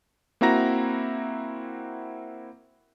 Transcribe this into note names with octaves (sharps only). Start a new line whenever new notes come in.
A#3 C4 E4 F#4 A#5 A#6